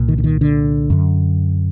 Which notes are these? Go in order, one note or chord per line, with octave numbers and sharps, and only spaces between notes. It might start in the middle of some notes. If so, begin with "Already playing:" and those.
Already playing: C2 A#2
D#3
D3
D#3
D3
F#2 D3